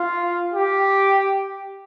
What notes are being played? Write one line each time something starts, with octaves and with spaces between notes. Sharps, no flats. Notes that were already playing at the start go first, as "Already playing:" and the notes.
Already playing: F4
G4